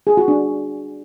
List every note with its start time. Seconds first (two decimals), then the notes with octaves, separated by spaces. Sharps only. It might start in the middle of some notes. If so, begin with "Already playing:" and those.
0.07 G#4
0.17 F#4
0.28 D4